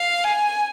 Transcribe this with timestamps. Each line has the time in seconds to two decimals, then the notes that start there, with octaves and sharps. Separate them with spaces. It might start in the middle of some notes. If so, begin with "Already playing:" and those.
Already playing: F5
0.24 G#5